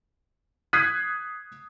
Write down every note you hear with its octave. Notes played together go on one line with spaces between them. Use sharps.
D#6 F#6 G#6 B6 C7 D#7